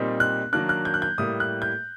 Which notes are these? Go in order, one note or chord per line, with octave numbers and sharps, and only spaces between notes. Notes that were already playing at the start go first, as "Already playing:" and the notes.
Already playing: A#2 G3 C4 D#4
F#6
D#3 F#3 A#3 D4 F#6
F#6
G6
F#6
G6
A2 G3 A#3 D#6
F#6
G6